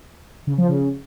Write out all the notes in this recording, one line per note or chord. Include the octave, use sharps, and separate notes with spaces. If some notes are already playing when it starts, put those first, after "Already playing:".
C#3
F3
C#3